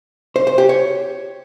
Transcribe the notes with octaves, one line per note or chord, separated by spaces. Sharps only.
C5
C5
G4
C#5